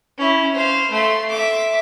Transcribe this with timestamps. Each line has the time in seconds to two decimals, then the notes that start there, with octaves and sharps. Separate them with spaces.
0.18 C#4 E4
0.54 C5 F5
0.91 A3 C6
1.30 E5 D6